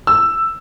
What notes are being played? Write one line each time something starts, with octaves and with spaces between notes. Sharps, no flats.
E6